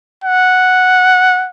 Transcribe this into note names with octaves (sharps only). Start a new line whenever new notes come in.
F#5